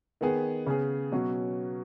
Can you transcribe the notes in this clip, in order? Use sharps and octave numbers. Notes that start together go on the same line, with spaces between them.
D#3 B3 G#4
C#3 B3 G#4
B2 F#3 C#4 F#4